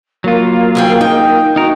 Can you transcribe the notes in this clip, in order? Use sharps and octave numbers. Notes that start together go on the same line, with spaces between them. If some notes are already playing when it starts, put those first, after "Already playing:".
F#3 A#3 F4
D2 G#4 G5
D#4 G5
D#4 F#4 A#4